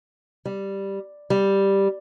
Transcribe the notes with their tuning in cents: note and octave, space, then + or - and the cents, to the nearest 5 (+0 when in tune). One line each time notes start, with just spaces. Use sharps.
G3 +0
G3 +0